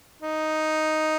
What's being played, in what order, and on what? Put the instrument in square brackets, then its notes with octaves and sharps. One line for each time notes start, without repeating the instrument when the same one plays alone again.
[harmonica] D#4